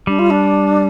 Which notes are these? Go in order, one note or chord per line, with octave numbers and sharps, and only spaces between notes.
G3 D4
F4
D4